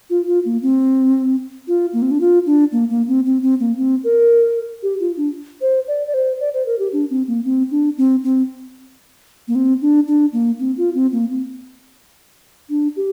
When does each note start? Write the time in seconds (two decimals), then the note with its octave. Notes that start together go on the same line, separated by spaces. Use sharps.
0.10 F4
0.27 F4
0.45 A#3
0.62 C4
1.68 F4
1.93 A#3
2.02 C4
2.11 D4
2.21 F4
2.46 D4
2.72 A#3
2.90 A#3
3.08 C4
3.26 C4
3.43 C4
3.60 A#3
3.77 C4
4.04 A#4
4.83 G4
5.00 F4
5.17 D4
5.61 C5
5.88 D5
6.07 D5
6.14 C5
6.40 D5
6.54 C5
6.66 A#4
6.79 G4
6.93 D4
7.10 C4
7.28 A#3
7.45 C4
7.71 D4
7.98 C4
8.24 C4
9.48 A#3
9.55 C4
9.82 D4
10.08 D4
10.33 A#3
10.59 C4
10.78 F4
10.95 C4
11.12 A#3
11.30 C4
12.70 D4
12.96 G4